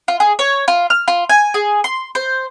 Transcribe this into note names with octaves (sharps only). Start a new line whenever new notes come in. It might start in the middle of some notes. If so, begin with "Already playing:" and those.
F4
G#4
C#5
F4
F6
F4
G#5
G#4
C6
C5